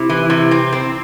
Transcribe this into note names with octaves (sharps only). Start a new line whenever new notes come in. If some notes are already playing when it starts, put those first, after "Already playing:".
Already playing: C3 E4
E3
C3
C4
C4